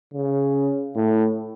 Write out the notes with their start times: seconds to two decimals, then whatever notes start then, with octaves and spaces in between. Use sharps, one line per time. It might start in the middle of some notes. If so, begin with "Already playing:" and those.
0.14 C#3
0.95 A2